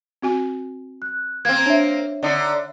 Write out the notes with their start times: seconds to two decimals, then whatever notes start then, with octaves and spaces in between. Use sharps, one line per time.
0.22 C4 F#4 G#5
1.02 F#6
1.45 A#3 C4 F5 G#6
1.66 D4 C#5 E5
2.23 D3 D#4